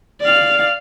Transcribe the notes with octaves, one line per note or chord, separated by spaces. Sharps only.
D5 F5